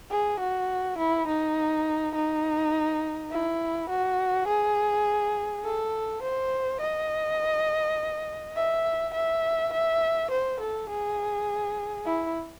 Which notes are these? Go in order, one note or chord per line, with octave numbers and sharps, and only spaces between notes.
G#4
F#4
E4
D#4
D#4
E4
F#4
G#4
A4
C5
D#5
E5
E5
E5
C5
A4
G#4
E4